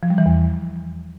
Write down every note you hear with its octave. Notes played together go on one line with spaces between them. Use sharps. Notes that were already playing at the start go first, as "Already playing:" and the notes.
F3
G3
E3
E2